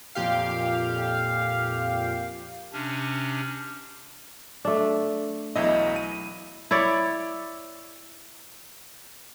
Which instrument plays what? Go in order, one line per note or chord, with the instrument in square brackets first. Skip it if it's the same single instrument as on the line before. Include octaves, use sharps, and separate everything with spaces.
[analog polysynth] F2 A#2 G4 F5
[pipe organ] C3 C#4 D4
[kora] A3 D4
[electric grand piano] B1 E2 D#5 [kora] E4
[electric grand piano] D#7
[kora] E4 C#5 D5